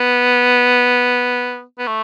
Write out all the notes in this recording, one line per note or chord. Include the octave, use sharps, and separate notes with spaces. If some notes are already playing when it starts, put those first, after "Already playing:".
Already playing: B3
B3
A3